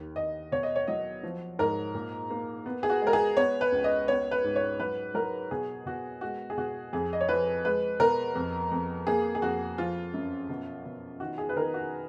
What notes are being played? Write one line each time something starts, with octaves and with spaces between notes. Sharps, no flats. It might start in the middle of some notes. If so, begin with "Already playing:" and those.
Already playing: D#2
D#2 D#5
B2 C#5
D#5
C#5
F#3 D#5
F3
G#2 A#4
A#2
A#3
B3
G#4
F#4
G#3
A#4
G#4
B3 C#5
B4
C#2
D#5
B3 C#5
B4
G#2
C#5
F#3 B4
F#3 A#4
B2 G#4
B2 F#4
G#3 F#4
G#4
B2 F#4
F2 G#4
D#5
C#5
F3 B4
G#3 B4
B2 A#4
F2
F2
A#3 G#4
G#4
F2 F#4
F3 F4
F#2
B2
B2
D#3 F#4
G#4
B4
D#3 A#4
F#4